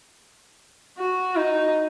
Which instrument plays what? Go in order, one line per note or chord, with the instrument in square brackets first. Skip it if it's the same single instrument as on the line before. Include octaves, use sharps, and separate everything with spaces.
[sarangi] F#4
D#4